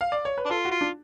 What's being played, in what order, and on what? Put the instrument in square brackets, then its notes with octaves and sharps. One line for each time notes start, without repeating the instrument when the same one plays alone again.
[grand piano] F5
D5
C#5
B4
[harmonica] D4
[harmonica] F4 [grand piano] A4
[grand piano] F#4
[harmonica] F4
[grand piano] D4